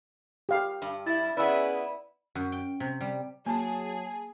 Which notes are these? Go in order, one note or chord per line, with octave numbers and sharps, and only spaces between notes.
G4 F5
G2
E4 E5 A6
B3 C#4 E4 G#4 B4 D5 E6
F#2
G5
C3
G3
F#3 A#3 G#4 G#5 A5